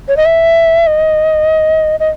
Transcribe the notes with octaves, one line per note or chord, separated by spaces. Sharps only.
C#5
D#5
E5
D#5
D#5